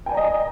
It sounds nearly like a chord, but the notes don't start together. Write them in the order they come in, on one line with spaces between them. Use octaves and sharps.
G5 G#5 D5 A#5 D#5